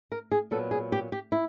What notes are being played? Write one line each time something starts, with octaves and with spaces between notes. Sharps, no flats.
A#4
G#4
A#2 F#3 B3 A4
G#4
G4
G4
E4